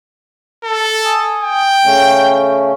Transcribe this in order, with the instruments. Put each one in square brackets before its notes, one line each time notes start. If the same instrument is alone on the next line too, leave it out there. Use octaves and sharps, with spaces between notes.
[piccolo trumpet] A4
[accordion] G#5 D#6
[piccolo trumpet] G5
[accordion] C#3 A3 C#4